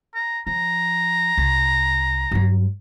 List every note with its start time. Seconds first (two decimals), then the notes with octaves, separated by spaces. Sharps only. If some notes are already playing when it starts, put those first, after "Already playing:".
0.15 A#5
0.47 F3 A#5
1.38 C2
2.32 G2 F#3